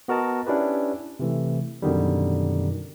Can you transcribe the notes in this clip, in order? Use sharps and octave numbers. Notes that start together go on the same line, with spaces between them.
B3 F#4 A#4 D#5 A5
C#4 D4 E4 G4 B4
C3 E3 A3
F#2 B2 D3 D#3 G3